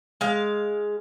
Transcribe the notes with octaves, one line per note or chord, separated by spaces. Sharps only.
G#3 F5